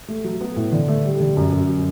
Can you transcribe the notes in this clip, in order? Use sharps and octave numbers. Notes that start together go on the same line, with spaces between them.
A3
F#3
B3
A2
D3
A3
G3
D3
F#2
F#2